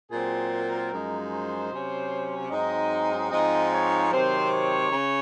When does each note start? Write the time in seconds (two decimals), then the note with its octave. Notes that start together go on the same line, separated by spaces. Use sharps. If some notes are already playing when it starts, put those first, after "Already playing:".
0.11 A#2 F#3 C4 G#4
0.51 A#4
0.92 F#2 F3 G#3 D#4
1.31 C5
1.72 C3 F#3 C#4
2.51 G#2 F#3 C4 D#4 D#5
3.31 G#2 F3 C4 D#4 D#5
3.72 C#5
4.11 C3 D#3 F#3 C4 C5
4.51 C#5
4.91 C#3